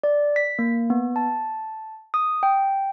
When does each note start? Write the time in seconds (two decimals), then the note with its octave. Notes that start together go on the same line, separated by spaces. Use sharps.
0.03 D5
0.36 B6
0.59 A#3
0.90 B3
1.16 A5
2.14 D#6
2.43 G5